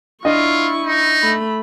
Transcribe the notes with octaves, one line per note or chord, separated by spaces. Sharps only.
D4 E4 F4 D#5 C#6
D#4
A3 B5